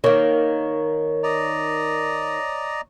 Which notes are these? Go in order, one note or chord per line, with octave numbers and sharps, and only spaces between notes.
D#3 A#3 C#5
D5 D#5 A#5